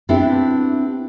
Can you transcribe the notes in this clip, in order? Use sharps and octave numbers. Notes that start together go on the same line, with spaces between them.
B3 C4 D4 E4 G4